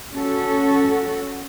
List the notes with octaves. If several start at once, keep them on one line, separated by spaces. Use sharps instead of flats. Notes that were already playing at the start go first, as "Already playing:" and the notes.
C#4 F#4 A4